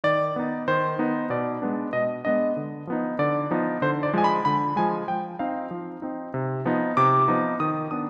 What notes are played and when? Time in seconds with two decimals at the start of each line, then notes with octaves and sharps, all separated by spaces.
0.04 D#3 D5
0.36 B3 D#4
0.68 D#3 C5
0.99 B3 D#4
1.30 B2 D5
1.62 G#3 B3 D4
1.93 B2 D#5
2.25 G#3 B3 D4 D#5
2.57 D3
2.87 F3 B3 D#4
3.19 D3 D5
3.51 F3 B3 D#4
3.82 D3 C5
4.03 D5
4.13 F3 G#3 G#5
4.24 B5
4.45 D3 B5
4.76 F3 G#3 G#5
5.08 F3 G5
5.39 C4 D#4 F5
5.71 F3
6.02 C4 D#4
6.34 C3
6.65 F3 B3 D#4
6.97 C3 D6
7.28 F3 B3 D#4
7.60 D#3 D#6
7.91 B3 D4 D#6